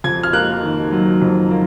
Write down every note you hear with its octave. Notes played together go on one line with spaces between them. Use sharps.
F2 G#6
F6
A#3 F#6
D#3
F#3
F2
A#3